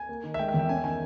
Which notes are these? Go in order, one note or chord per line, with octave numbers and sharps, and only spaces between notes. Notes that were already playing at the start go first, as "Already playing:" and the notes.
Already playing: G#5
A#3
D#3
E5
G#3 G5
E5
E2
G5
C#4 G#5
D#3 G#5